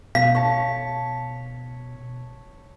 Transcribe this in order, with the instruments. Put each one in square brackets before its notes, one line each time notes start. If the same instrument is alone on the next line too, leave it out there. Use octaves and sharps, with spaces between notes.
[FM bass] B2 [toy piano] F5 [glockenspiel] B6
[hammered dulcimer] C#5 A5